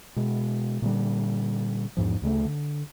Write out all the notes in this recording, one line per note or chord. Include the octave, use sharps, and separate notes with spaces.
B2 G#3
A#2 D3 G3
E2 G#2 F3
D2 C#3 G3 A3
D3